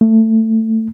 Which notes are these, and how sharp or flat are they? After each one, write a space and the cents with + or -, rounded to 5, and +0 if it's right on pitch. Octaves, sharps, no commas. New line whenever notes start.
A3 +15